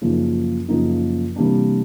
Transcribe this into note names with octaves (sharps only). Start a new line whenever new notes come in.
F#2 C#3 F3 A#3 D#4
F#2 C#3 F3 A#3 D#4
C3 E3 G3 A#3 D4